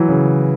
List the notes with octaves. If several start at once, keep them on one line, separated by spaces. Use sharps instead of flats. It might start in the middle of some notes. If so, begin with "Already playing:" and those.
Already playing: E3 F#3
C#3